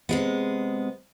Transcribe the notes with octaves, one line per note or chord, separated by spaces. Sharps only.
C3 G#3 B3